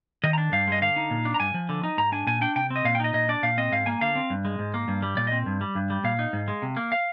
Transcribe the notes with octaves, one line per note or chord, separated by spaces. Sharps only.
D#3 D#5
A#5
D4
G2 F5
G#3 D#5
D3 F5
D#4
A#2
D4
A#5
G2 G#5
F3
D3
D#4
G#2 A#5
D4 G#5
A#2 G#5
D4 G5
C3 G5
C4
D#5
A#2 F5
G5
D#4 D#5
A#2 D#5
D4 D5
A#2 F5
C4 D#5
G#2 F5
A#3 G#5
D3 F5
C4
G2
G#3
G#2
A#3
G2
G3
A#2 D5
C4 D#5
G2
G3
G2
G3
A#2 F5
D#4
G#2
G#3
C3
A#3
F5